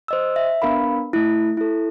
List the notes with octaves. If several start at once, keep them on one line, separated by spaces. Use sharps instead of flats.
C5 D#5 E6
E5
B3 D4 A#4 F5 B5
A3 E4
E4 A4